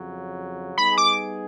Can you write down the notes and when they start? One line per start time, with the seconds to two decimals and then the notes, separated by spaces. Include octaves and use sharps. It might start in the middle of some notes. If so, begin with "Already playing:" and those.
Already playing: F2 C#3 F#3
0.77 G3 B3 D#4 G#4 B5
0.98 D6